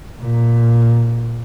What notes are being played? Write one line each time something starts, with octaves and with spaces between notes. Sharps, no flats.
A#2